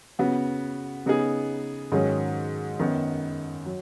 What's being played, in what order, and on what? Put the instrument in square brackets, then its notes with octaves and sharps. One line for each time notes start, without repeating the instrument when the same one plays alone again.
[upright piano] C#3 B3 F#4
C#3 B3 D#4 G#4
G#2 D#3 F#3 C#4 G#4
F#2 D#3 B3 D#4
F#3